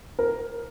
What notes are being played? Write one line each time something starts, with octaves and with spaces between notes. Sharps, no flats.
A#4